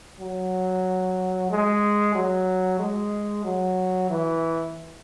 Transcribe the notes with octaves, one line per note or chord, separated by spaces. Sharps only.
F#3
G#3
F#3
G#3
F#3
E3